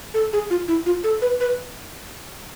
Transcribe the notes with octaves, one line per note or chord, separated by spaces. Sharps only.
A4
G#4
F4
E4
F4
A4
B4
B4